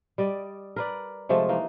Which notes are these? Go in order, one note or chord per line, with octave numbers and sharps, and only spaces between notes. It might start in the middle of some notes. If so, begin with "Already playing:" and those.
G3 D5 D#5
A#4 B4 D5
C3 F3 G#3 A3
E3 A#3 D#4